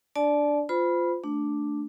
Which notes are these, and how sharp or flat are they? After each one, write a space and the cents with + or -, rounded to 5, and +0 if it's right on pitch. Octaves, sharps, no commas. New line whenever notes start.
D4 +0 D5 +0 A5 -30
F4 +0 C5 -35 B5 -10
A3 +0 D4 +0